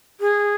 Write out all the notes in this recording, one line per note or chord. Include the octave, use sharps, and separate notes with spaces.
G#4